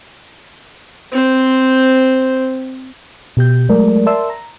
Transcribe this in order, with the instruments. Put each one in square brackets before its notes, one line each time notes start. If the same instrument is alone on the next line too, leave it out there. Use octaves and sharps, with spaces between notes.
[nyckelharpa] C4 C5
[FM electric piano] B2 G4 G6
F#3 G#3 A3 A#4 D5
A#4 D5 E5 A5 C6 E6
A#5